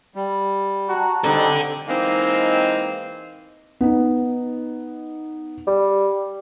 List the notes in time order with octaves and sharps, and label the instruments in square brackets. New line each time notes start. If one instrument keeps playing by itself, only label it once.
[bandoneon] G3
[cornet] F#4 [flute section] A5 A#5
[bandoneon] G3 C4 [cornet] D#4 [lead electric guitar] A4 D5
[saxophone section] E3 G#3 A#3 C4 D#4
[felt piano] B3 D#4
[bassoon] G3